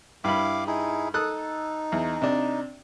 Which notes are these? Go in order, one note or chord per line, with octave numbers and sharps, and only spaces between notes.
G2 E4 F5 B5 D6
D#4 E4 G#4
D#4 A4 D#6 F#6
E2
C3 D4